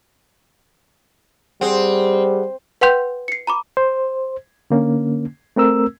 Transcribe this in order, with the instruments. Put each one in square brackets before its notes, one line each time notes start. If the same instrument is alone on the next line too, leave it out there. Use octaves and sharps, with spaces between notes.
[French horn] G3 [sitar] C4 [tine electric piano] G#4 F#5
[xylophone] B4 F#5 G5 C6 G6
C7 C#7
A#5 B5 D6
[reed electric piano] C5
D3 A#3 C#4
A3 C4 A#4 E6